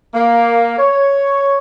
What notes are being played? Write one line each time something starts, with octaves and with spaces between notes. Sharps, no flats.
A#3
C#5